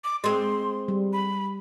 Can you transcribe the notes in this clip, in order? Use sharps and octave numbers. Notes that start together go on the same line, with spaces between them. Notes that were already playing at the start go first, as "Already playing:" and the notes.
D6
G#3 C4 C6
G3
B5